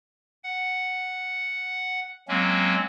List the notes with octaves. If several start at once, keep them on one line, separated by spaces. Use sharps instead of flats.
F#5
F#3 G#3 A#3 C4 C#4